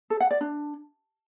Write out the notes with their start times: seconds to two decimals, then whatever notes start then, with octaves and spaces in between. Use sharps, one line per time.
0.10 A4
0.20 F#5
0.31 D5
0.41 D4